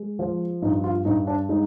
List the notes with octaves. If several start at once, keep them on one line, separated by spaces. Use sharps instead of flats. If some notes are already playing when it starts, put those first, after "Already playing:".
Already playing: G#3
F3
G2 D#4
F4
G2 D#4
D4
G#3 D#4